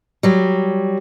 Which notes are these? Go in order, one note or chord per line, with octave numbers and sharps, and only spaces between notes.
F#3 G3